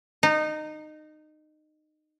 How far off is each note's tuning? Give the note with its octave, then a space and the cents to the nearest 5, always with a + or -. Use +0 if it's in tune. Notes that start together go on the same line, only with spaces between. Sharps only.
D#4 -20